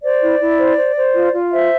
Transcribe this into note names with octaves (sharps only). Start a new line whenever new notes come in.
C5 D5
E4
E4
C5
C5
C5
F4
F4
C5 E5